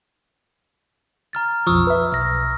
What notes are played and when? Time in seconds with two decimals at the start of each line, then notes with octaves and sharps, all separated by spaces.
1.33 A#5 F6 A6
1.67 B1 F2 F3 C#6 D#6 E6
1.87 B4 E5
2.12 B1 F6 A#6